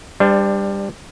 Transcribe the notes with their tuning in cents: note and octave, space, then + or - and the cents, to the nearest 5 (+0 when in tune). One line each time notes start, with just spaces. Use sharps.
G3 +15 D4 +0 C5 -30